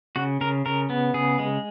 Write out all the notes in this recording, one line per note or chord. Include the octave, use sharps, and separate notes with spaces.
C#3 F#4
C#3 A#4
C#3 A#4
B3
C#3 G#4
G#3